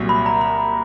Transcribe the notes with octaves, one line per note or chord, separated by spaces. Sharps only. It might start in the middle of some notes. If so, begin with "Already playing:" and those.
Already playing: C2 A#2 F#3
B5
A#5
B5